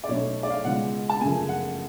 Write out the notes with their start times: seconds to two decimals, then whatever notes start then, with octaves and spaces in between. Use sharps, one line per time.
0.04 D5
0.08 B1 B2 A3 C#5
0.43 D5
0.50 F5
0.64 C#2 B2 G#3 F#5
1.09 A5
1.21 F#2 C#3 F3 A3 G#5
1.49 F#5